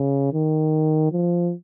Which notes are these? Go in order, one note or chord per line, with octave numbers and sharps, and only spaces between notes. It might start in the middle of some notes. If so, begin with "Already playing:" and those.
Already playing: C#3
D#3
F3